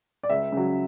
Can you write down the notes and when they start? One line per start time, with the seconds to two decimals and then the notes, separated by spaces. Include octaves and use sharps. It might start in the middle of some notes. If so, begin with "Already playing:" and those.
0.23 D5
0.29 C#2 E5
0.52 C#3 F#3